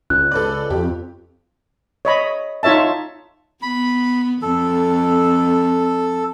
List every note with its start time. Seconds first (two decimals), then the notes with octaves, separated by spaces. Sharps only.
0.10 C#2 F#6
0.31 A4 B4 D5
0.70 F2 G4
2.05 C#5 D#5 B5
2.63 D#4 F4 C#5 E5 A5
3.62 B3 B5
4.42 F2 A4